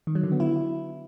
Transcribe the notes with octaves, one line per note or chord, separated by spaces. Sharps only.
D#3
F#3
D3
B3
E4